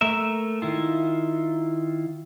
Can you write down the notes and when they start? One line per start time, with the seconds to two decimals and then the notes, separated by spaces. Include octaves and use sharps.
0.01 A3 A#3 A#4 E5
0.62 D#3 E4 F4